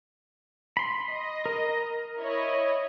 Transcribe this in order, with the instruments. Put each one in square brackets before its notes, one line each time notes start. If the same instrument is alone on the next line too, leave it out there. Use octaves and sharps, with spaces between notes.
[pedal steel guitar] B5 C6
[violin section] D#5
[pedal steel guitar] A#4
[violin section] E4 C#5 D#5